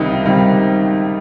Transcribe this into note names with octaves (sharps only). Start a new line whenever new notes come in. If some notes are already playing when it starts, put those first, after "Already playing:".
Already playing: C#2 C3 D#3 G3 C4 D#4
C#2 C3 D#3 G3 C4